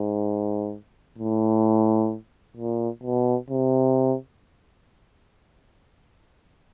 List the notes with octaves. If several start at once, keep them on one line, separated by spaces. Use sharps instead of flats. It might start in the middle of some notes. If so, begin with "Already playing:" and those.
Already playing: G#2
A2
A#2
B2
C3